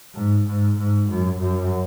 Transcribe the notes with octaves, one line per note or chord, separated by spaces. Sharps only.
G#2
G#2
G#2
F#2
F#2